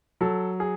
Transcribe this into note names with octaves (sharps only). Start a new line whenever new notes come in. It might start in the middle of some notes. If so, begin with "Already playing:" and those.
F#3 A4
G#4